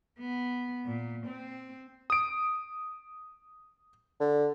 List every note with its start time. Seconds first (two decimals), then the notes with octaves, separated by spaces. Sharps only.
0.17 B3
0.86 A#2
1.26 C4
2.10 D#6 D7
4.20 D3